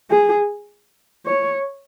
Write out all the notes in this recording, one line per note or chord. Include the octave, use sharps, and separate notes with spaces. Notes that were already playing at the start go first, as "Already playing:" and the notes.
G#4
C#5